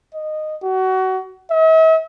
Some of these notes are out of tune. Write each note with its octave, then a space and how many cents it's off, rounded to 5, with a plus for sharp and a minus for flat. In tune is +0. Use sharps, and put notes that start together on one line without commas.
D#5 -15
F#4 +25
E5 -45